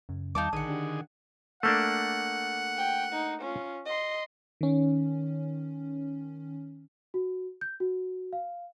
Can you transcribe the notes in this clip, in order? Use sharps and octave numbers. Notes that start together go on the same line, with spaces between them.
F#2 C#3
E2 D#3 G3 D#4 F5 A5 D6
A#1 D3 D#3 D#4 G#4 F#5 D#6
D4 G4
A3 A#3 D4 F#5
G5
D#4
C#4 F4
D#5 C6
D#3 C#4
F#4
G6
F#4
F5